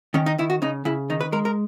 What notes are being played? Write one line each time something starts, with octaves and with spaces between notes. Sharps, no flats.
D#3 C#4
D#4
D#3 E4
F#4
C#3 D#4
C#3 E4
D#3 D#4
B4
G#3 A#4
A#4